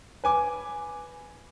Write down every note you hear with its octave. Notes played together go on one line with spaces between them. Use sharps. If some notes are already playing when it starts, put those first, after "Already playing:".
B4 G#5 D6